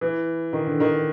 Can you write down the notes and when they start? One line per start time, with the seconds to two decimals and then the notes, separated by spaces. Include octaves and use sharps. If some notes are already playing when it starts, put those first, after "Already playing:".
0.01 E3
0.53 D#3
0.67 D3
0.80 D#3